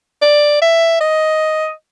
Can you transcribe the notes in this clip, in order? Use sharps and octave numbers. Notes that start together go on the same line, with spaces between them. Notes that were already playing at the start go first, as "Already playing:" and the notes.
D5
E5
D#5